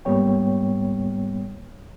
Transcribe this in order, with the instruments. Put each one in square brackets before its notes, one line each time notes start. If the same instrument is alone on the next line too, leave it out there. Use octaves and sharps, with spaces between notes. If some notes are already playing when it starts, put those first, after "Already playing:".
[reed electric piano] G#2 G3 A#3 B3 C#5 G5